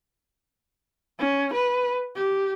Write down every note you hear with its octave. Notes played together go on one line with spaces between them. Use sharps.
C#4
B4
G4